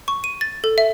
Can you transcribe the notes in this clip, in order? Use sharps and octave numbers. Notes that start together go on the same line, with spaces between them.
C#6
D#7
A6
A4
E5